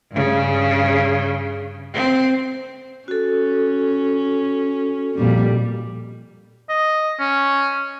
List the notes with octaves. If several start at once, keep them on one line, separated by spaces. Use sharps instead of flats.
G2 C#3
C4
C#4 F#4 A4
F2 A#2 G3
D#5
C#4